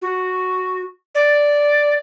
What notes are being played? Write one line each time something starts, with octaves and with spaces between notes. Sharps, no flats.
F#4
D5